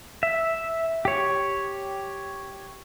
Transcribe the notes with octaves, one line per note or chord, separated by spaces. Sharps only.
E5
G4 C#5